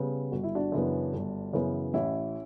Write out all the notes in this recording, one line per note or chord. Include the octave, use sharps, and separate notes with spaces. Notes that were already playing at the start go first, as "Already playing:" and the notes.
Already playing: C#3 G3 B3
G1 F#4
E4
D4 F#4
F#2 C#3 E3 B3
G1
F#2 C#3 E3 B3
A1 C#4 E4